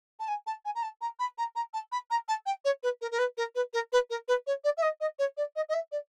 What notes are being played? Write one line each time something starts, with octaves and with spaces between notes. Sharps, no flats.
A5
G#5
A5
G#5
A#5
A5
A#5
B5
A#5
A#5
A5
B5
A#5
A5
G5
C#5
B4
A#4
A#4
B4
A#4
B4
A#4
B4
A#4
B4
C#5
D5
E5
D#5
D#5
C#5
D5
D#5
D#5
E5
D5